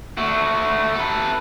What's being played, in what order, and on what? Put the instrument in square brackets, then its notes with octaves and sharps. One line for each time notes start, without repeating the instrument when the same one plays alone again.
[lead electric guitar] A3 F#4
A4 B4